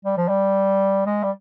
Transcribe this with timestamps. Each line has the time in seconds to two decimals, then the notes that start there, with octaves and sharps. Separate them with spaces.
0.05 G3
0.17 F3
0.29 G3
1.06 G#3
1.23 G3